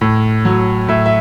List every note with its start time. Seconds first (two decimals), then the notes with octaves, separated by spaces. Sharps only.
0.01 A2
0.45 F#3
0.88 A2 E5
1.06 E5